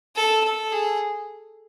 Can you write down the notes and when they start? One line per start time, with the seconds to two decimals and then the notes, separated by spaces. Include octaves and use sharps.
0.16 A4
0.44 A4
0.72 G#4